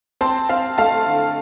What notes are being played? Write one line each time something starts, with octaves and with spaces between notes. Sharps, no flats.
C4 A5 C6
C4 F5 A5
A3 F5 A5
D3